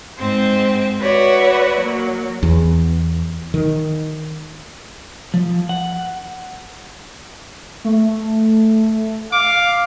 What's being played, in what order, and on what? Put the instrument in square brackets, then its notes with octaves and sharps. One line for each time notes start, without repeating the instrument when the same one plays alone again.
[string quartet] G#2 C4 C5
F#4 B4 C#5 D5 E5 F#5
F#3 A#3
[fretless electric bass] E2
D#3
[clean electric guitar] F3
F#5
[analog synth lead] A3
[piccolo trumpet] F5 [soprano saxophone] D6